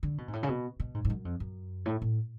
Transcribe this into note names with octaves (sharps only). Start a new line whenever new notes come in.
D3
B2
G#2
A2
C#3
B2
B2
G#2
G#2
F#2
F2
F#2
A2
A2